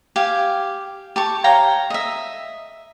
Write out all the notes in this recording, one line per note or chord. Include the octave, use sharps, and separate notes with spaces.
G4 F5 G#5
G4 A5 C#6
C#5 F5 G5 A#5
D#5 E5